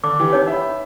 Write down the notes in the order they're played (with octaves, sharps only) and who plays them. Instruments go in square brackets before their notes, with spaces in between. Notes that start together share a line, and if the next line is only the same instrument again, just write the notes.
[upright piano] D3 [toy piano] D6
[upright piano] E3 G4
[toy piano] D#4 C#5
[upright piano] E5 B5